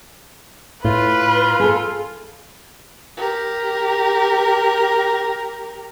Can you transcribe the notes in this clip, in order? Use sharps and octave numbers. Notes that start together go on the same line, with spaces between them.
A2 F4 B4
G#4 A4
G4 A#4